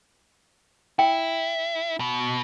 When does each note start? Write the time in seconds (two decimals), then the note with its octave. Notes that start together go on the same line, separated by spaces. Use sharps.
0.99 E4 G5
2.00 B2